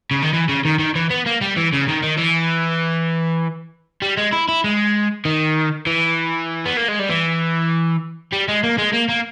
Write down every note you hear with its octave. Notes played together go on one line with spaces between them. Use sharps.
C#3
D#3
E3
C#3
D#3
D#3
E3
B3
A#3
G3
E3
C#3
D#3
D#3
E3
G3
G#3
E4
E4
G#3
D#3
E3
B3
A#3
G#3
G3
E3
G3
G#3
A#3
G#3
A#3
A#3